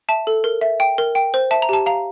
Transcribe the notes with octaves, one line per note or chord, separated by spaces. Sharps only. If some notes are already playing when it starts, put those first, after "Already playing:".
E5 A5
A4
A#4
E5
G5
A#4
G5
C5
E5 A5
A#5
G4 A5
F5 A#5